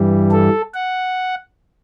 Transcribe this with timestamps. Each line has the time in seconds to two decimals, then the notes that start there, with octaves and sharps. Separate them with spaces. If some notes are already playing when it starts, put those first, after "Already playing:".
Already playing: G2 E3 G3
0.31 A4
0.74 F#5